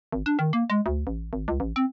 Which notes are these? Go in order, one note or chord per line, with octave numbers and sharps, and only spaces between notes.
G#1
D4
D#3
A#3
G#3
D2
A1
G#1
C#2
A1
C4